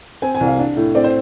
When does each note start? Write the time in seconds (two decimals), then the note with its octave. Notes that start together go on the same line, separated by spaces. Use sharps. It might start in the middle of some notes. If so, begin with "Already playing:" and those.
0.22 C4 G#5
0.35 G#5
0.40 C2
0.47 F5
0.59 D4
0.77 A2
0.95 C4 D5
1.04 C5